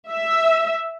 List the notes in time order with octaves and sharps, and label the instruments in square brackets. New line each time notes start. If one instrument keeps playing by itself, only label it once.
[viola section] E5